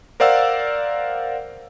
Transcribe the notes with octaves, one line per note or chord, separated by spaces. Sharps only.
A#4 C5 D5 F5 F#5 E6